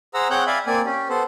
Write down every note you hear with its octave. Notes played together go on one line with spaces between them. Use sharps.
G#4 C5 F#5 A#5 E6
C4 G#4 C#5 F#5 F#6 G6
D5 E5 F5 G#5 B5
A#3 C4 D5 G#5
C#4 G4
B3 A4 C5